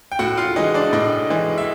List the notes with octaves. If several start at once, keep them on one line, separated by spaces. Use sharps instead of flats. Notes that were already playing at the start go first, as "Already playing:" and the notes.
G5
A2 F#4 F#5
F4 F5
E3 G#3 D#4 D#5
D4 D5
A2 D#4 D#5
E3 G#3
E5